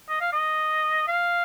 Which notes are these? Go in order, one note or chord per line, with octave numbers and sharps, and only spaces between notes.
D#5
F5
D#5
F5